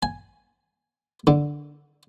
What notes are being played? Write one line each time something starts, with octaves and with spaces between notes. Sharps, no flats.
G#5
D3